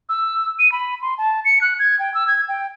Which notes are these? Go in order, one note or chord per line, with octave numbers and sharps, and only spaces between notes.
E6
D#7
B5
C6
A5
C#7
F#6
G#6
G5
E6
G#6
G5